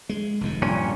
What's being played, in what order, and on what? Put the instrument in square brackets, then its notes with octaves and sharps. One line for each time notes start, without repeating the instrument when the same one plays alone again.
[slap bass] G#3
F1 D#2 D#3
[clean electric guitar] G2 A#2 C#4